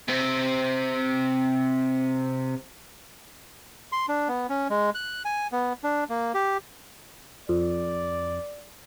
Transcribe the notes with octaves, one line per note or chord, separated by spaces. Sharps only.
C3 C4
C6
D4
B3
C#4
G#3
F#6
G#5
B3
D4
A#3
G4
F2 D5